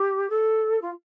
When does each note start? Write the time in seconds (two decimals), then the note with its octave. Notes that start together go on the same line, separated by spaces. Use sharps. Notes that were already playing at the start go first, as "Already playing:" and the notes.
Already playing: G4
0.30 A4
0.82 F4